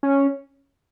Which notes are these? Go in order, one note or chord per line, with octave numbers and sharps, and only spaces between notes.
C#4